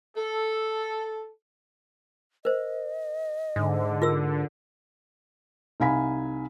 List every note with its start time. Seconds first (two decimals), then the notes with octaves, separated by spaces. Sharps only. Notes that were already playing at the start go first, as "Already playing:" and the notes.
0.16 A4
2.45 A#4 C5 D#5
3.56 G#2 D3
4.02 F4 A#4 E6
5.80 C2 D#4 F5 G#5 B5 B6